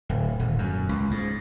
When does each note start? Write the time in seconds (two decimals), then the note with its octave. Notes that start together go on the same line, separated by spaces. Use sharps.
0.09 D1
0.39 D#1
0.58 F#2
0.89 C#2
1.11 G#2